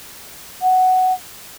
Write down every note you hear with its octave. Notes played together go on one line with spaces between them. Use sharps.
F#5